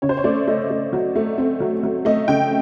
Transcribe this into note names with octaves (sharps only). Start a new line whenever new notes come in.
C#3 C#5
C5
C#5
A3 D5
A3 D#5
A3
F#3
A3
C4
F#3
F#3
A3 D#5
C#3 G5